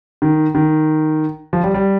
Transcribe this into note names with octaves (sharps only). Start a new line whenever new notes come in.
D#3
D#3
F3
G3
G3